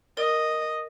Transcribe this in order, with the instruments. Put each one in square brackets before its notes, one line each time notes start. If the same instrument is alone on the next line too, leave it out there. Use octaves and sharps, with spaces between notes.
[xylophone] A#4 [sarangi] D#5